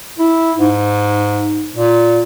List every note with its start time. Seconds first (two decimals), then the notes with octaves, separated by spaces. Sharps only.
0.19 E4
0.57 G#2
1.76 A#2